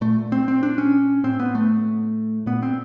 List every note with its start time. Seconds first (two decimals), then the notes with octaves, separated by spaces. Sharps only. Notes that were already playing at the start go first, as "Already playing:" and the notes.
0.01 A#2 A3
0.32 C4
0.48 C4
0.63 D4
0.78 C#4
1.24 A2 C4
1.40 B3
1.55 A3
2.46 A#2 B3
2.63 C4